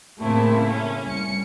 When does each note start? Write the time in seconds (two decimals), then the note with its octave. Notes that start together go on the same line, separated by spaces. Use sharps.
0.19 A2 C#3 A3 A#3 C4 E4
0.65 C#4
1.05 C2 C#7